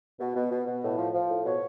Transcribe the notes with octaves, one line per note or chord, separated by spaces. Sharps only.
B2
B2
B2
B2
A2
F3
F3
A2
B2 C#5